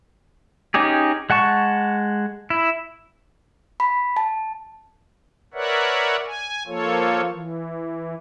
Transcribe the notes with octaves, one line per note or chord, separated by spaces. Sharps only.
C#4 D#4 G4 G#4
G#3 F#5 A5 C#6
E4
B5
A5
A#4 B4 C#5 D5 E5 F#5
G#5
F3 A#3 F4 A4 C#5
E3